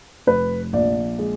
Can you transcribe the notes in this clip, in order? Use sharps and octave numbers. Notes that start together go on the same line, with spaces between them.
F1 B4
A#1 D5
G#3